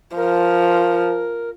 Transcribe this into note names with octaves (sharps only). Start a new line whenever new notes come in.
F3 A#4